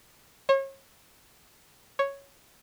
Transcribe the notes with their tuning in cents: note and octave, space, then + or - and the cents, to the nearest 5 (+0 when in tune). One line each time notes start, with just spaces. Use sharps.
C#5 -35
C#5 +0